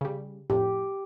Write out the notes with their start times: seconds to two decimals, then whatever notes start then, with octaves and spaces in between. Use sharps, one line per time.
0.01 C#3 G3
0.50 F2 A2 G4